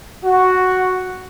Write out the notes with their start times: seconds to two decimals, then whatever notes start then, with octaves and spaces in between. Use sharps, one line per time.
0.24 F#4